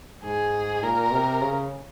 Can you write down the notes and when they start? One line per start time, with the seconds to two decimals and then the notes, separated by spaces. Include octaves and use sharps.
0.24 G#2 G#4
0.83 A#2 A#4
1.12 C3
1.42 C#3